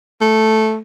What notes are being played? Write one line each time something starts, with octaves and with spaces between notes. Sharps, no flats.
A3